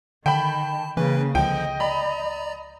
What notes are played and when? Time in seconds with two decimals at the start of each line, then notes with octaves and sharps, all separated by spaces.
0.26 D3 D#3 G5 A5 B5
0.97 C#3 E3 A#3 C#4 B4
1.35 C#2 D3 F3 D#5 G5
1.80 D5 A#5 B5